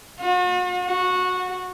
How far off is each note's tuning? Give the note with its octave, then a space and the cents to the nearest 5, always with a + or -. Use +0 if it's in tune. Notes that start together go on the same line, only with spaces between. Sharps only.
F#4 -45
F#4 -15